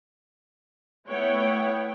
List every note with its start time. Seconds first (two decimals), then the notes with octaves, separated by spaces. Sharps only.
1.09 A3 B3 E4 C#5 F#5 G5